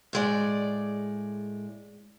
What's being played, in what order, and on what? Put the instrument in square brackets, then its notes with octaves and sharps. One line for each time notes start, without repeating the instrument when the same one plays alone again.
[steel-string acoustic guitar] A2 G#3 D5